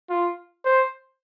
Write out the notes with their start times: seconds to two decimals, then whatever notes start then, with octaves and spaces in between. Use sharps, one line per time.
0.10 F4
0.65 C5